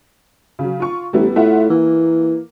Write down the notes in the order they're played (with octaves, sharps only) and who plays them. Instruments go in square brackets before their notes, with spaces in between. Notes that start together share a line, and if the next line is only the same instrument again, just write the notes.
[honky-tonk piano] C#3 F#3
F4 C#6
[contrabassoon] A1 [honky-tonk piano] G3 B3 E4
[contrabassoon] A2 [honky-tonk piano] F4 E5 F#5
[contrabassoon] E3 [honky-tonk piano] A#3